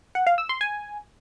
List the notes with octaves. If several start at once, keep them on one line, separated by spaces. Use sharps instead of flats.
F#5
F5
E6
C6
G#5